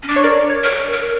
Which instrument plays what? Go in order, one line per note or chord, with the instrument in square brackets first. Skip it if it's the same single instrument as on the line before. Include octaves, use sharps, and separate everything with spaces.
[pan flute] C#4
[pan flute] D4 [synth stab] D5
[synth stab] C#5
A#4 D5
C#5
[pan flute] A#4
A#4